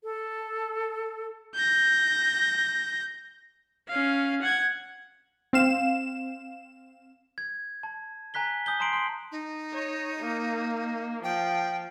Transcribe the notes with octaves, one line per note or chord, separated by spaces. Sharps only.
A4
G6 A#6
C#4 F5
F#5 G#6
C4 F5 E7
G#6
A5
G#5 A#5 F#6 B6 G7
G#5 D#6 G6 G7
A5 A#5 C6 C7 D7 F#7
C6 G7
D#4
C#5
A#3
F3 G5